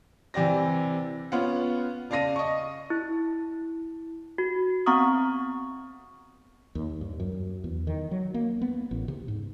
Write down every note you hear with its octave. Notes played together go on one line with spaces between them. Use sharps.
C3 E3 G4 D5 A#6
B3 C#4 F4 F#5
C#3 D5 F5 A5 A#6 D#7
D#5 C#6
E4
F#4
B3 C4 F#5 A#5 C#6 D#6
D#2
G2
F#2
E2
D#3
F#3
A#3
B3
A1
C3
G#2